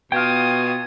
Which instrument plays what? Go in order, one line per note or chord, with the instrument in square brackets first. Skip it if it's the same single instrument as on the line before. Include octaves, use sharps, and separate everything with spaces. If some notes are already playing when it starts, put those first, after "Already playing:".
[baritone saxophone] B2 [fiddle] F4 D#6 [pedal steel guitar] G5 F6 [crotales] G#6